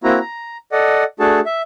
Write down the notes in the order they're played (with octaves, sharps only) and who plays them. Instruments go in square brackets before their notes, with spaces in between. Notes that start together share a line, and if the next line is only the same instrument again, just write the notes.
[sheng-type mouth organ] A#3 C4 E4 F#4 A#5
A#5
A4 D5 D#5 F#5
A3 D4 F#4 G#4 A4 A5
E5